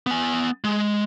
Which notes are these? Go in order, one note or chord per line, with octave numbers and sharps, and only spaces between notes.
B3 G#5
G#3